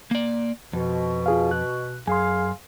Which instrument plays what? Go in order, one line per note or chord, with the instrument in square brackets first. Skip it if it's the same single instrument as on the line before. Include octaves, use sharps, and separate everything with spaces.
[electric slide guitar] A#3 D5
[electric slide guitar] F2 [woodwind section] B2
[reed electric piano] F4 G#4 F5
F#6
[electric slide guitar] F#2 [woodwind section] G#4 F5 [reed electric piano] G#5 C6